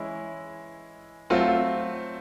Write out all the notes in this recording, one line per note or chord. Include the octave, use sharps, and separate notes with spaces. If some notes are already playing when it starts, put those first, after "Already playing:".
Already playing: E3 G#3 C#4 E4
F#3 A3 C4 F4